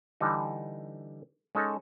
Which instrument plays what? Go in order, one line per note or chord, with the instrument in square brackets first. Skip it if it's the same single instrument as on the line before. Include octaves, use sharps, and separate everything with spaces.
[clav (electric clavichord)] D3 E3 G3 D#4
G#3 C#4 D#4 A4